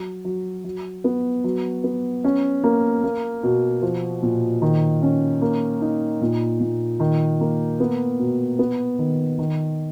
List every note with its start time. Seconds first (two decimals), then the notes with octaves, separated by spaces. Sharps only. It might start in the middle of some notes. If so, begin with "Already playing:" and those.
Already playing: F#3
0.25 F#3
0.64 F#3
1.04 B3
1.44 F#3
1.84 B3
2.24 C#4
2.64 A#3
3.03 A#3
3.43 B2
3.82 F3
4.23 A#2
4.62 D#3
5.02 C#4
5.42 A#3
5.81 D#4
6.21 A#2
6.60 A#2
7.00 D#3
7.41 A#3
7.80 B3
8.19 B2
8.59 B3
8.99 D#3
9.38 D#3